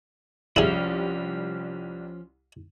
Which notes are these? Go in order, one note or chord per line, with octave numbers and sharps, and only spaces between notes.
C2 F3 G3 C#4 E4 G#4